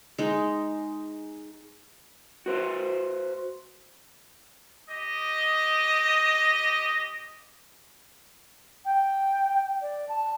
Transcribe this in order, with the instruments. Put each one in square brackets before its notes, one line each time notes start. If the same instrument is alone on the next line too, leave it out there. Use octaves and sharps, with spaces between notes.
[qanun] G#3 D#4
[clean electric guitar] F#4 B4 C5
[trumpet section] G4 D#5
[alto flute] G5
D5
A5